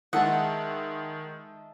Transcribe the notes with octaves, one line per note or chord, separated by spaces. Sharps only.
D#3 G#3 D#5 E5 F#5 A5